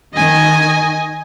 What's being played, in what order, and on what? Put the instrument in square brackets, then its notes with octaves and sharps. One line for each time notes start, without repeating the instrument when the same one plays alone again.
[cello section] D#3 [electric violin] D#5 G#5